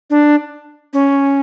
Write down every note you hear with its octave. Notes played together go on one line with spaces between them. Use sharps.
D4
C#4